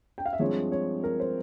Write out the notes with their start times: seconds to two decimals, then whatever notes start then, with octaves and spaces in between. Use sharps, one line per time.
0.18 G5
0.26 F5
0.33 E5
0.39 G2 F3 G#3 C4 C#5
0.72 C#5
1.04 A#4
1.20 C5